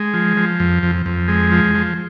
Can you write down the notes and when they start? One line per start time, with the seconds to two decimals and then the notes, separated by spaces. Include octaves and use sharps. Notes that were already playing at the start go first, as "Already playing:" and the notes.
Already playing: G#3
0.14 F3
0.37 F3
0.60 F2
0.83 F2
1.06 F2
1.28 G#3
1.52 F3
1.75 F3